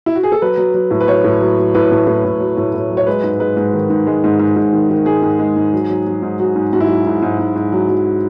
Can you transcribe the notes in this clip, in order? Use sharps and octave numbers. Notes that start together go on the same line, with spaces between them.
E4
F#4
G#4
A4
F#3 B4
F#3
F#3
A2
B4
F#3 C#5
A2
F#3
F#3
A2 B4
A2
A2
A2
F#3
A2
A2
F#3
C#5
G#3 B4
G#2
G#3 B4
G#2
D#3
G#2
G#3
G#2
G#2
G#2
D#3
D#3
G#2 G#4
G#2
G#3
G#2
F#3
F#3
F#3
G#2
F#3 F#4
G#2
G#2 F#4
E4
F#3 F#4
G#2
G#2
G#2
G#2
F#3
F#3